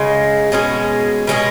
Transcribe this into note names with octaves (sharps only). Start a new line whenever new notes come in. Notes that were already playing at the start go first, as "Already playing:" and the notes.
Already playing: C#3 G#3
B2 G#3 C#4 G#4
B2 G#3 C#4 G#4